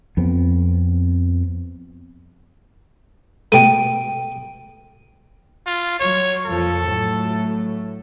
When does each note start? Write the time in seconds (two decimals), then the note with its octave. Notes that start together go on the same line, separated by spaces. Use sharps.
0.17 F2 B3 C4
3.52 B2 A3 G5 D#7
5.67 F4
6.00 F#3 C#5
6.46 F2 A#2 F3 A4
6.85 A2 F#3 A3